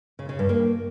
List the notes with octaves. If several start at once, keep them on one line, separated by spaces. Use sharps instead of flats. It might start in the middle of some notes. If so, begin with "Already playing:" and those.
C#3
C#3
G2
A#3